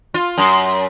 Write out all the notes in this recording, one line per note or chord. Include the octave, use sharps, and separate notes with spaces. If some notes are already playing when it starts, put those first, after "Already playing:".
F4
F#2